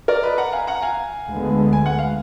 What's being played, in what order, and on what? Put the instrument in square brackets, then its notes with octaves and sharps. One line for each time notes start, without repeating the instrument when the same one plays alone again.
[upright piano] A#4 D5
B4 D#5
F#5 A#5
F5 G#5
F#5 A#5
F5 G#5
[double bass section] D2 D3 G#3 B3
[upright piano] G#5
F#5
F5